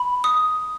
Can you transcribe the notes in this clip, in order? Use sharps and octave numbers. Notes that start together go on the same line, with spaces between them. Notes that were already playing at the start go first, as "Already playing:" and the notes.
Already playing: B5
D#6